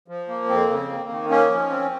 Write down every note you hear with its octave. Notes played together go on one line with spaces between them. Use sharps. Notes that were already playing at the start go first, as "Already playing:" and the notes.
F3
A#3
F2 C4
C#3
A#3
D#3
A#3 C#4
F3
C4